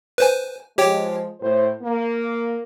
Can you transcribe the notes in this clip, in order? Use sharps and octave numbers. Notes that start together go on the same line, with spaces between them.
B4 C5 G#5
F3 G#3 G4 C#5 G5
A2 C5
A#3